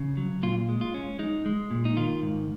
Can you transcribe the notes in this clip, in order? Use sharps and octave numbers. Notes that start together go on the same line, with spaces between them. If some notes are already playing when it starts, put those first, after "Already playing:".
Already playing: C#3
F#3
A#2 F4
G#3
F4
C#4
G#3 D#4
G#3
A#2
D#4
D#3 F4
G#2